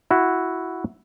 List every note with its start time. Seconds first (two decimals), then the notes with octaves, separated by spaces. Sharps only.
0.11 E4 F#4